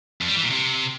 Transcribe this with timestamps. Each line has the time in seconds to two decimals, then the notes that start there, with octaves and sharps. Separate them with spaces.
0.21 F2
0.28 G3
0.36 E3
0.43 A#2
0.50 C3